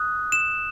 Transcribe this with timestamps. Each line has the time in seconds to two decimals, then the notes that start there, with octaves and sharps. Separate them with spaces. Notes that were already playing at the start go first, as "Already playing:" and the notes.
Already playing: D#6 F#6
0.32 E7